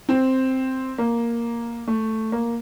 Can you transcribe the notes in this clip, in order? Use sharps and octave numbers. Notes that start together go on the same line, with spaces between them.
C4
A#3
A3
A#3